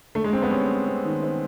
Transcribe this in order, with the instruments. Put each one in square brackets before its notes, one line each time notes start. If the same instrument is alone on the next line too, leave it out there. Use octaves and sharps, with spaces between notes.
[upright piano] D3 [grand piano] A3
[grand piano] G#3
[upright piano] D3 [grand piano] C4
[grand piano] B3
[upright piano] G3 [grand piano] C#4
[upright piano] G3
C4
D#3
C4